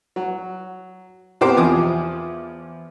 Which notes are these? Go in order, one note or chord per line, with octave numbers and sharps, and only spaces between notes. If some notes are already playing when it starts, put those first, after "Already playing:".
F#3
B2 C4 G4 A#4 C5 D6
E2 F3 G#5 D6 D#6